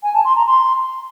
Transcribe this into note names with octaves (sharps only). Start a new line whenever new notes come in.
G#5
A5
C6
A#5
C6